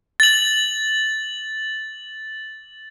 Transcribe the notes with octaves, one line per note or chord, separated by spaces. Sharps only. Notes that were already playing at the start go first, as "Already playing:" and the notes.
A6 F#7